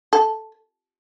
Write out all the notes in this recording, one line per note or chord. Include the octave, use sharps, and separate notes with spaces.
A4